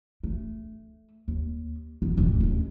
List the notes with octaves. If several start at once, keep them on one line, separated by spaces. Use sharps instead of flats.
A3
D#2
F2 B3
D1 F#2
D#2 C#3